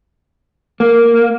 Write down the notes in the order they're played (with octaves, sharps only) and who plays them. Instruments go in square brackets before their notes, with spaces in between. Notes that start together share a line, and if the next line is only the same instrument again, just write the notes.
[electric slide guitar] A#3